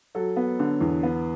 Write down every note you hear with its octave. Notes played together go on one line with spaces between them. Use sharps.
F#3 A4
B3
D3
E2
B3